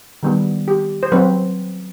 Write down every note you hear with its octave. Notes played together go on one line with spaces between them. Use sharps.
D#3 G3 B3
G4
C5
F#3 C4 B4